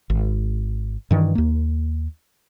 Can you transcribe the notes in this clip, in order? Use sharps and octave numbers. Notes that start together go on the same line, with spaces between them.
G#1
G2 D#3 E3
D#2 A#3